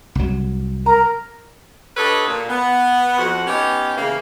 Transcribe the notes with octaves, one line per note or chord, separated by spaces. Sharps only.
C2 F#3
A#4 A#5
D4 G4 A4 B4 C#5 D#5
A#2
B3
F2 F#4 F#5
B3 C#4 D#4 G4
C#3 E3 A#3